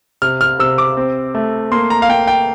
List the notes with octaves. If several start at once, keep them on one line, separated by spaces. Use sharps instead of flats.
C3 F6
F6
C3 E6
D6
C4
A3
A#3 C6
A#5
F5
A#3 G5
G5